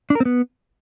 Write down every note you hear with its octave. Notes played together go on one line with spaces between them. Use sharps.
D4
A#4
C4
B3